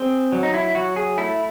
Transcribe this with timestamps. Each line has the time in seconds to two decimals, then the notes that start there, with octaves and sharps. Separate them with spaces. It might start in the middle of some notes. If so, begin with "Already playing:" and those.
Already playing: C4 G#4
0.32 F#3
0.43 D#4
0.54 E4
0.75 F#3 F#4
0.96 G#4
1.18 A3 E4